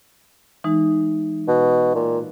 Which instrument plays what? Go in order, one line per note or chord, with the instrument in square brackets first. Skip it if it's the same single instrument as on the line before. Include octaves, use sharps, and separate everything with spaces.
[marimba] E3 G#3 D#4
[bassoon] B2
A#2